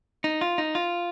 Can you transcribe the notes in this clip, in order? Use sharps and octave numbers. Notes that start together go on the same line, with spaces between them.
D#4
F4
D#4
F4